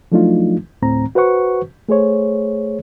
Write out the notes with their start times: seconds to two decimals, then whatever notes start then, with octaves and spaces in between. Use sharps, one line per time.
0.12 F3 F#3 A3 D4 D#4 F4
0.82 D2 A2 C4 A#5
1.15 F#4 B4 C5 F#5 C#6
1.88 A3 G#4 C5 C#5